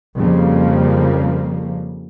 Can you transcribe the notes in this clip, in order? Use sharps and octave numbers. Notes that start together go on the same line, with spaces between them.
F2 C#3 F3 G3 A#3